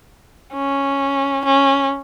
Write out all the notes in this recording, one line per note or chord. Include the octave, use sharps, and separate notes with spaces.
C#4
C#4